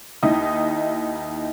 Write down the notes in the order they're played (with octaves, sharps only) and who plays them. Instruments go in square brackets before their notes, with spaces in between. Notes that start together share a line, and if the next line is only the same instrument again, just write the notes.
[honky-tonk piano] D#2 D#4 E4 D#6